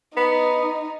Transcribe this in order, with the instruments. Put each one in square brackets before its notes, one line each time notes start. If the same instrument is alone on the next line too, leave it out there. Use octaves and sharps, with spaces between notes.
[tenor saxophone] B3 [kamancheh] D#4